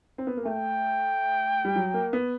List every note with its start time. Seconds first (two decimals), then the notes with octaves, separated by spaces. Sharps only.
0.18 C4
0.27 B3
0.37 A#3
0.45 A3 G5
1.65 G3
1.76 F#3
1.94 A#3
2.13 B3